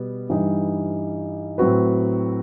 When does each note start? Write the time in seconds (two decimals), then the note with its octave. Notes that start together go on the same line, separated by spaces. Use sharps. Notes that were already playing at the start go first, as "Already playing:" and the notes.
Already playing: B2 G3 B3
0.29 G2 E3 G3 D#4
1.58 A2 F#3 C4 F#4 B4